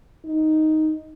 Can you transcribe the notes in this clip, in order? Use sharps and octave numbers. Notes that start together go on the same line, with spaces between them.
D#4